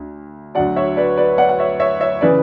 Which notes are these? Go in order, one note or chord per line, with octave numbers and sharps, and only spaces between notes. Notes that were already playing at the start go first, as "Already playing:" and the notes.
Already playing: D2
D2 D3 F#3 D5 F#5
C#5 E5
B4 D5
B4 D5
D5 F#5
F#5
C#5 E5
C#5 E5
C#5 E5
C#3 E3 B4 D5